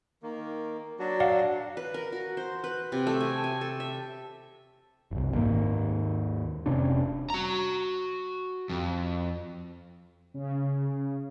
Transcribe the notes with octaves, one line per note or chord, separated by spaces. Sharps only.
D#3 A#3
F#3 D4 F#4
D5 F5 F#5
B4
A#4
F#4
C5
B4
C3
A3
G#5
G#5
A4
E5
F#1 C2
D#2 G#2 D#3 A#3
F1 C3 C#4 D4
F#4 A#5
F2
C#3